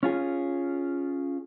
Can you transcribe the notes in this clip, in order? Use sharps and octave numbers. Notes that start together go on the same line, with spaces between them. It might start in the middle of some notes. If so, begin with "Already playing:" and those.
C#4 F4 G#4